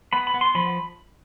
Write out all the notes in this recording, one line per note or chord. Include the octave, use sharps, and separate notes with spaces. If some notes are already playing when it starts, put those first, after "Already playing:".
B3 B5
B5
B3
C6
F3 B5